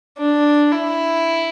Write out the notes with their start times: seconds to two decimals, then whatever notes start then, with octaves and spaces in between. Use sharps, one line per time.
0.18 D4
0.72 E4